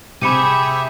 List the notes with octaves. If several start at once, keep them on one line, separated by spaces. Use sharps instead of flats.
C3 G4 G#4 E5 B5 C#7 D#7